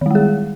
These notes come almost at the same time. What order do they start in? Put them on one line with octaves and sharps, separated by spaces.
D#3 G3 G#3 G#4